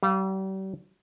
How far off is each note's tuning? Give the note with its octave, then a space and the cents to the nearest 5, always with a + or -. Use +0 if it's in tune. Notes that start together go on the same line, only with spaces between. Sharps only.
G3 -40 F5 +0